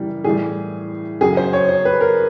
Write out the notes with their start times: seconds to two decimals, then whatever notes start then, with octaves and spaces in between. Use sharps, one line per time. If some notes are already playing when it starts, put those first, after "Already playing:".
Already playing: F#2 C#3 E3 G3
0.24 A2 E3 G3 G#4
1.21 F#2 C#3 F#3 G#4
1.37 C5
1.53 C#5
1.69 C5
1.85 B4
2.01 A#4